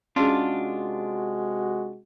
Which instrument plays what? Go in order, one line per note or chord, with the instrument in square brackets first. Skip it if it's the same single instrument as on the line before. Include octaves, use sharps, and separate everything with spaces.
[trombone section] C3 G#3 F#4 [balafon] C#4 G#4 [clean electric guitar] D4 F4